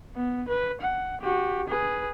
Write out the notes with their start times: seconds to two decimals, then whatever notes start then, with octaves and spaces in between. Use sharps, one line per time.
0.15 B3
0.48 B4
0.81 F#5
1.21 F#4 G4
1.67 G#4 B4